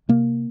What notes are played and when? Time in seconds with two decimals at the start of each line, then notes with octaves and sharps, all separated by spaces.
0.09 C3 A#3